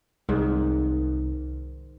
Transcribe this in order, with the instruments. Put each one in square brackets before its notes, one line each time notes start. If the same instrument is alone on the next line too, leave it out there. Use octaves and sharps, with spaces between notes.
[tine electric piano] C2 [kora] G#2 D#3